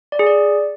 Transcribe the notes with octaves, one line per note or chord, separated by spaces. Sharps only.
D5
G#4
D5